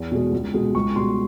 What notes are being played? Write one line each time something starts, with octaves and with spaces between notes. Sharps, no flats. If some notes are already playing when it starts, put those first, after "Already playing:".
Already playing: E2
B2 G#3
C#2
B2 G#3
C#2 C#6
B2 G3 C6